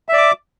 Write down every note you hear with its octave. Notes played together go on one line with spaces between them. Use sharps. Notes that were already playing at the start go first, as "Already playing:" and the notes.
D5 E5 D6